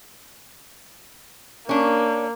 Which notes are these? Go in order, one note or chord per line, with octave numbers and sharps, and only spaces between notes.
A#3 C#4 D4